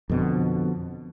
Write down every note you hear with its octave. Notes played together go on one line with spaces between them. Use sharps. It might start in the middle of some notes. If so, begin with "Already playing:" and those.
F2 B2 D3